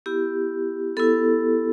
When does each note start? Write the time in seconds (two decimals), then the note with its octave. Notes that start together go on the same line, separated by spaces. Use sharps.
0.06 B3 E4 G4
0.97 B3 E4 A4